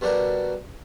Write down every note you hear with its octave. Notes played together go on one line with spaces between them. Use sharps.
B2 G3 D4 F#4 A#4